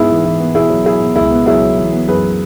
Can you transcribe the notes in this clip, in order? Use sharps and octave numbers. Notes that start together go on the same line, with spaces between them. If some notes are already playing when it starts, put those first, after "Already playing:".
Already playing: G#2 B3 E4 G#4
E3
E3
B3
B2 E4 G#4
F#3
F#3 E4 G#4
B2
C#2 E4 G#4
B3
F#3 E4 G#4
F#3
E3
B3
F#2 G#4 B4